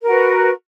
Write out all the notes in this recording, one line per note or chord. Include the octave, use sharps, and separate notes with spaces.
F#4 A#4 B4